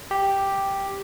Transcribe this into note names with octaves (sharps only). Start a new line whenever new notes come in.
G4